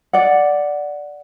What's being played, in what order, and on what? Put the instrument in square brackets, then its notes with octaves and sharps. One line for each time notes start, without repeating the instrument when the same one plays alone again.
[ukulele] D5 F#5